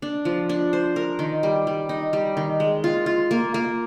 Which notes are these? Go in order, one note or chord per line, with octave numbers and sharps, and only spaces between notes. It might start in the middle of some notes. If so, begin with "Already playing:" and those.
D4
F3
D4
C5
A#4
D#3
G3
G3
D#4
G3
D#3
G#3
F4
F4
A#3
A#3